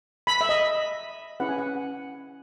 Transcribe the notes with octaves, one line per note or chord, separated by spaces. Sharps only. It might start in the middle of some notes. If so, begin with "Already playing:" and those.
B5
E5
D#5
C#4 E4 G#4 B4 F#5
G#5
F#5